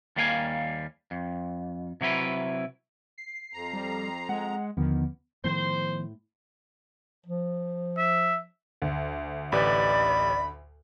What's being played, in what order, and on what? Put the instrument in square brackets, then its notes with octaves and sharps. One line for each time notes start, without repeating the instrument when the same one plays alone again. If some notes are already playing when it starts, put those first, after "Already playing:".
[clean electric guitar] D#2 G3 A#3 F5 G5 G#5
F2
C3 F#3 E4 B4
[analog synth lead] C7
[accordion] F2 A#5
[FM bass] G3
[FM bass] G#3 [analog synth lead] F#5
[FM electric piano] D#2 D3 F3 [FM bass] D#3 [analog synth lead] B3
[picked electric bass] A2 [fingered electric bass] D#3 F3 B3 [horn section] C5
[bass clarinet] F3
[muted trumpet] E5
[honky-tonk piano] D2
[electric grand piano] A1 G4 B4 [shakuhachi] D5 [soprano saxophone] B5